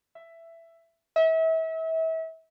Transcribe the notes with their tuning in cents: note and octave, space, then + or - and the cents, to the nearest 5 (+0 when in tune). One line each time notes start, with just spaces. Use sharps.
E5 +10
E5 -35